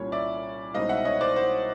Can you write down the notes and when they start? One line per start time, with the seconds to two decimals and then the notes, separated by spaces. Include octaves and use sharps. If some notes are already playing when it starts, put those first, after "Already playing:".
Already playing: C2 A#2 G3 A#3 C#4 C#5
0.12 D5 E5
0.74 C2 B2 G#3 C4 D#4 D#5 F5
0.89 E5 F#5
1.05 C#5 D#5
1.21 C5 D5
1.36 C5